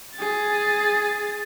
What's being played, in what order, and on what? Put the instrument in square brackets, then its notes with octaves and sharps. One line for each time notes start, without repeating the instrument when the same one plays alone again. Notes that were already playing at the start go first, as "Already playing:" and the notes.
[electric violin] G#4 A6